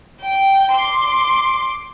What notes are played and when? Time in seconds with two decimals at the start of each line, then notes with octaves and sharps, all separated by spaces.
0.22 G5
0.73 C6 D6